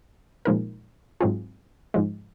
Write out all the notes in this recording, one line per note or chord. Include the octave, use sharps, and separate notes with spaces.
A#2 F3 G#3 D#4 A#4
G#2 F#3 C4 F4 G#4
G#2 F3 G#3